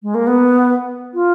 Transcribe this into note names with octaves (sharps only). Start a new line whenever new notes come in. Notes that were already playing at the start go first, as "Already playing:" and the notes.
G#3
A#3
B3
F4